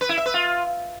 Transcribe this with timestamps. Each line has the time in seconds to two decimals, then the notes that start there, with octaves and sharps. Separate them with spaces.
0.01 B4
0.09 E4
0.17 E5
0.26 B4
0.34 F4